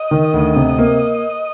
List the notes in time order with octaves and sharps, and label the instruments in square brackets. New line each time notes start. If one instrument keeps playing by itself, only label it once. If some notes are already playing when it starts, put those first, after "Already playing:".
Already playing: [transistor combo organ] D#5
[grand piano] D#3
D2
C3
A#3